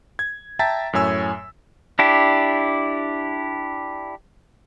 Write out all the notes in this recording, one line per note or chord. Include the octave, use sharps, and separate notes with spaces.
G#6
E5 G5 A5 A#5 A6 B6
F#2 A2 C#5 G#5 E6
D4 E4 G4